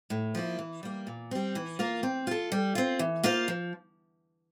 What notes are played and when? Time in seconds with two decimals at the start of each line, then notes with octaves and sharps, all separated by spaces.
0.10 A2
0.35 F3 A#3 E4
0.59 E3
0.83 G3 A#3
1.07 A#2
1.31 G3 C4
1.55 E3
1.79 A#3 F4 A#4 F5
2.03 C4
2.27 F4 A4
2.52 G3
2.75 C4 F4
2.99 E3
3.23 A#3 F4 C5 F5
3.48 F3